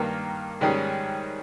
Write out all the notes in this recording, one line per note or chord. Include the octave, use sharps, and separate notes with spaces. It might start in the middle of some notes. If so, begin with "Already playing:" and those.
Already playing: G2 D#3 A#3
G#2 D#3 G3 C#4 G#4